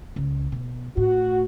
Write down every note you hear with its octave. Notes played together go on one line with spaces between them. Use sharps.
C#2
B2
A2 F#4